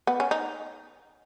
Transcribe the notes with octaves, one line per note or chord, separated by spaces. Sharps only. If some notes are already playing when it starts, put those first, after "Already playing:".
B3
C#4
D#4